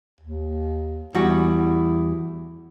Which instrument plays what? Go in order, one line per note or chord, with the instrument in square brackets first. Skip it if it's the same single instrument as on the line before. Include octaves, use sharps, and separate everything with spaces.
[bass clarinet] D#2
[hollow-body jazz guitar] E2 G3 F#4 [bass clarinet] E4